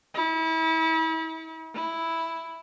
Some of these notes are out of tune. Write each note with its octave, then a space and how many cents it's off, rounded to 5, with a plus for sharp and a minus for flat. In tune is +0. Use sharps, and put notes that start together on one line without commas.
E4 -35
E4 +0